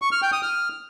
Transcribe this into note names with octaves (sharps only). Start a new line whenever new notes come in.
C#6
F6
G5
D#6
F6